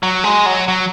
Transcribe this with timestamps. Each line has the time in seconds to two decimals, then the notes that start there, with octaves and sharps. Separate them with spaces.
0.03 F#3
0.24 G#3
0.46 F#3
0.68 F#3